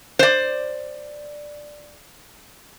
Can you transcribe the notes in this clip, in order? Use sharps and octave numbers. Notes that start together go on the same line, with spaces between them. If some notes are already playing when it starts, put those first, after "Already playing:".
C5 D5